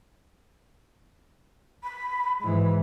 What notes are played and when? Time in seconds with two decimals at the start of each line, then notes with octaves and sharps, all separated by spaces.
1.83 B5
2.41 G#2 E3 B5